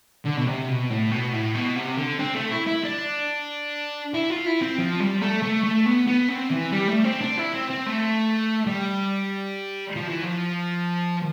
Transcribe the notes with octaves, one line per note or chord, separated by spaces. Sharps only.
D3
B2
C3
B2
A2
B2
A2
B2
C3
D3
C4
A3
E4
E4
D4
E4
F4
E4
C4
F3
G3
A3
A3
A3
B3
B3
C4
E3
G3
A3
C4
D4
E4
C4
C4
A3
G3
F3
E3
F3